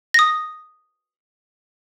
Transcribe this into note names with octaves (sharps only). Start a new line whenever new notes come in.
D#6 A#6